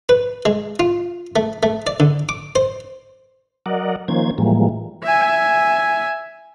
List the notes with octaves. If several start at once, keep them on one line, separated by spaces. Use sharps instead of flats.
B4
G#3
F4
A3
A3
D5
D3
D6
C5
F#3 A#4 D5 D#5 F#5
D#3 F3 A#3 C#4 C5 G#6
A2 E3 F3 G3 G#3 A#3
E5 G#5